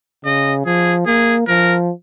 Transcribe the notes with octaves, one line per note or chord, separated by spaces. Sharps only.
C#3 D#5
F3 G#4
A#3 G#4
F3 A#4